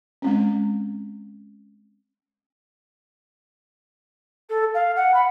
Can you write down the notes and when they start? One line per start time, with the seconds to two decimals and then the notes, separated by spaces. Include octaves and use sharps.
0.22 G#3 C4 C#4
4.49 A4
4.74 F5
4.96 F#5
5.14 B5